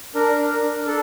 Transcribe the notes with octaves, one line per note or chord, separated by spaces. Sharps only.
D4 A#4
D4
A#4
D4
D4 A4